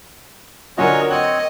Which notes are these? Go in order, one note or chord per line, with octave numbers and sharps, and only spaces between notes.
D3 F#3 C#4 F4 F#4 A#4 C#5 D#5
C4 C#5 D#5 F#5